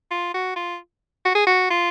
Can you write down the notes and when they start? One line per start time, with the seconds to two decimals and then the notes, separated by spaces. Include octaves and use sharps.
0.11 F4
0.34 F#4
0.56 F4
1.25 F#4
1.35 G#4
1.47 F#4
1.71 F4